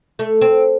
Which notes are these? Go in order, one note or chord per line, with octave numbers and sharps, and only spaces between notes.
A3
C4